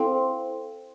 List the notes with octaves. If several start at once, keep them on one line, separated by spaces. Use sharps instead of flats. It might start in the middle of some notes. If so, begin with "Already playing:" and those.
Already playing: C4 E4 A4 C5 F5 C6